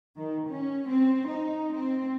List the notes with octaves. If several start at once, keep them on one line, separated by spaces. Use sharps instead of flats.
D#3
C#4
C4
D#4
C4